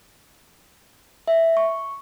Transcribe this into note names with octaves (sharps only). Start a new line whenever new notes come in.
E5
C#6